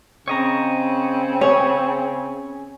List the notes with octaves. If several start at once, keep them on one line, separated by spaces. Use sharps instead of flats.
C#3 C4 C#5 D#5 A#5
C#4 G#4 C#5